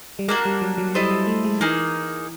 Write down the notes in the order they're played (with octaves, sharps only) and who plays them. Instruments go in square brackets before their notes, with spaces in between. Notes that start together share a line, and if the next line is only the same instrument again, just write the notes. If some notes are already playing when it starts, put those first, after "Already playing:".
[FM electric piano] G3
[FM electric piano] G#3 [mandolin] A#3 D4 F#4
[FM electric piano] G3
F#3
F#3
[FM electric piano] G3 [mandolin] E4 A4 C5 D#5
[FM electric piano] G3
A3
G#3
[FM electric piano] E3 [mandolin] A#3 D#4 G#4